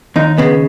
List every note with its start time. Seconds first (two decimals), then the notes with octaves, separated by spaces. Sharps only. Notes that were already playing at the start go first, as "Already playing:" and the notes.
0.16 D#2 D#4
0.38 C#3 B3